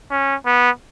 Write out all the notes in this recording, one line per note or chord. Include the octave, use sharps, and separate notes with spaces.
C#4
B3